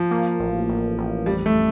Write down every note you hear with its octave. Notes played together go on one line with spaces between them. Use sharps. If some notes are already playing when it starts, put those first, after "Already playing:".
Already playing: F3
A#3
A1
A1
A1
F2 G3
A3